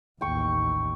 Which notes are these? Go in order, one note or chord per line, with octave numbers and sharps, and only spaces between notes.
A1 D#2 G5 C#6